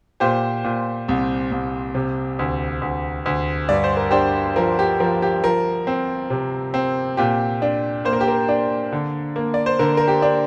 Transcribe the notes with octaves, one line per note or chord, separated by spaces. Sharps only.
A#2 G4 C5
A#2
C2
C2
C3
D2
D2
D2
G2 D5
C5
A#4
D4 G4 C5
F3 A#4
G4
F3 A#4
G4
F3 A#4
C4
C3
C4
A#2 G4
D4
A#3 C5
A#4
G4
A#4
D4
D3
A#3
D5
C5
D3 A#4
A#4
G4
D4